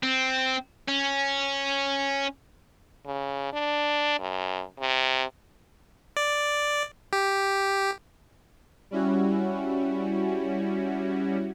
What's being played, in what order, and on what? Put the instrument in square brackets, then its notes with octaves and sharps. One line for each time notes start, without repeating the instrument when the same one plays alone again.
[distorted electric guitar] C4
C#4
[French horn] C#3
D4
F#2
C3
[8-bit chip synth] D5
G4
[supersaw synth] G3 C#4 E4 F#4